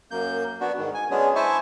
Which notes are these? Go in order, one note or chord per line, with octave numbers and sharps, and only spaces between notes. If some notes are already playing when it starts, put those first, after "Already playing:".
F#2 A#3 G6
B3 D4 F#4
G#2 D#3
G#5
F#3 G#3 B3 C#4 D4 G#4
E4 C5 E5 G#5 A5 C#6